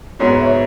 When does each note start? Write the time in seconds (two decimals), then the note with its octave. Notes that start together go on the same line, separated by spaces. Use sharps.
0.19 G#2 F#3 B3 G#4 C#5
0.32 B4
0.40 E5
0.46 C#5